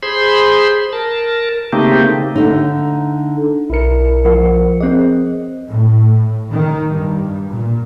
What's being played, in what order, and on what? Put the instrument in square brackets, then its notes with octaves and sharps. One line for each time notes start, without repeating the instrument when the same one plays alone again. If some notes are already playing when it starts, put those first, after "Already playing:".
[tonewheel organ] G#4 C5 B5 C6
A#4 A5
C#3 A3 A#3 C4 D#4 G4
[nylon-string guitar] D3 A3 D#4
[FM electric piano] B1 C#7 [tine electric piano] E4 A#4
[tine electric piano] F3 [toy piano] A#4 F#5
[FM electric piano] C4 D#5 [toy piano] G#4 C5 C#5
[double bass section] A2
D#3
G2
A#2